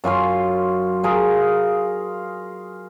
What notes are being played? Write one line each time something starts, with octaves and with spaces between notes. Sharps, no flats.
F#2 F4 G#5 C6
F4 G#4 A#4